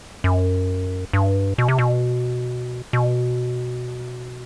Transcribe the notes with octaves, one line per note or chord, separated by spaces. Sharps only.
F#2
G2
B2
C3
B2
B2